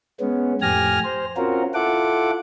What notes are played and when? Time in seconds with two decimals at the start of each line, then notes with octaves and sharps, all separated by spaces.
0.20 G#3 B3 C#4
0.62 F2 A2 G4 G#5 F6 A#6
1.04 C5
1.37 C4 C#4 F4 F#4 A#4
1.74 E4 F4 A4 F#5 D6